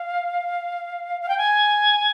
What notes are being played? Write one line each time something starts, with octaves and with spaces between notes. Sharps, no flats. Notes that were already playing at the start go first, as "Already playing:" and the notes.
Already playing: F5
F5
G5
G#5